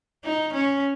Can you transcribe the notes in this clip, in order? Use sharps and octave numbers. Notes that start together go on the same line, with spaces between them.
D#4
C#4